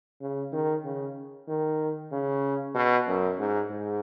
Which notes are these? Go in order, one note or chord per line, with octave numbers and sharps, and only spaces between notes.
C#3
D#3
C#3
D#3
C#3
B2
F#2
G#2
G#2